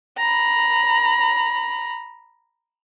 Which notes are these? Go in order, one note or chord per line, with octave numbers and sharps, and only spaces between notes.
A#5 B5